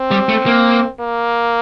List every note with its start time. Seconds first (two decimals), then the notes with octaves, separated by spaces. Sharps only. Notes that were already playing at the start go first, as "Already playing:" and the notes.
Already playing: C4
0.11 G3
0.29 A3
0.46 A#3
1.00 A#3